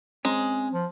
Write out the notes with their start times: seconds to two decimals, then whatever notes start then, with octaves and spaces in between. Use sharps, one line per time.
0.25 G#3 C4 C#4 A#5
0.73 F3